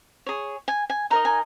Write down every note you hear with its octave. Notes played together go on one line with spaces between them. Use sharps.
G#4 C#5
G#5
G#5
D#4 A#4 D#5 A#5
G#5